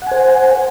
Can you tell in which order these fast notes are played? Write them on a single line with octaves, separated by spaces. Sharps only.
F#5 G#5 C5